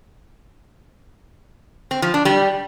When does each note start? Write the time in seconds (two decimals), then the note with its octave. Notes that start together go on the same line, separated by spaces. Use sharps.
1.91 C4
2.02 F3
2.14 D4
2.25 G3